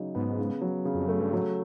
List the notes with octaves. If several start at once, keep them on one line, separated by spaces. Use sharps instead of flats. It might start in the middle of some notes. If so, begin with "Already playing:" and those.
Already playing: C#3 F#3 D#4
G#2 B3
C#3
F#3
C#3
F2
F#2 A3
G2
G#2 F#3